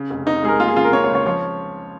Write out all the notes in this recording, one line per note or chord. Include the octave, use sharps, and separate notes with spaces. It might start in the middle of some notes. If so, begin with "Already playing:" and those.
Already playing: C#3
F1
F1 D#4
G#3 G#4
A#4
A#3 F4
G#4
C#3 F4
A#4
A#3 C#5
C#5
C#2
C#5
F3 C#5